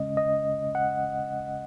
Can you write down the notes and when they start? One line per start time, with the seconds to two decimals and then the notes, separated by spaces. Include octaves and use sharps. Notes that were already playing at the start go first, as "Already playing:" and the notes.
Already playing: C#3 G#3 C#4 D#5
0.17 D#5
0.75 F#5